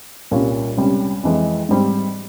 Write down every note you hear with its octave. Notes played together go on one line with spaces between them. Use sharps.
C2 A#2 G3 C#4 F4
C#2 C3 G3 C#4
F2 E3 G#3
G#2 G3 C4